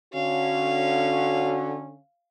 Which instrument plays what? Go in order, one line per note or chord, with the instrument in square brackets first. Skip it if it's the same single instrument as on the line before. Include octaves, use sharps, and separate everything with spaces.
[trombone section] D3 C#4 [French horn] F#4 [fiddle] F5